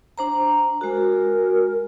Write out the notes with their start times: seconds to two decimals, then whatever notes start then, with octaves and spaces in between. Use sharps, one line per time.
0.18 D4 C5 A#5
0.81 G#3 F#4 A#4